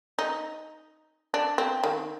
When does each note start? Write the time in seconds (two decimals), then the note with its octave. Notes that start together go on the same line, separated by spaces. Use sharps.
0.19 D#4
1.34 D4
1.58 C4
1.84 D#3